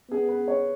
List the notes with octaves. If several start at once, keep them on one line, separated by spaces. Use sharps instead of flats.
B3 G#4
B4
C#5